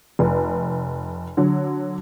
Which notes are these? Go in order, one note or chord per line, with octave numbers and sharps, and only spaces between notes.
F1
D3 F#3